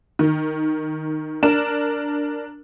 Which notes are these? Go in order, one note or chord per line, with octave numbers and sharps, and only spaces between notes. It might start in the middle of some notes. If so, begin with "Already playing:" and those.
D#3
D4 A#4 E7